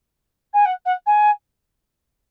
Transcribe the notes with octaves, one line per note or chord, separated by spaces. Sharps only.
G#5
F#5
F#5
G#5